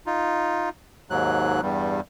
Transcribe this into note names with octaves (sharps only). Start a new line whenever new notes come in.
D#4 F4
D#2 G#2 F#3 F#6
E2 G2 G3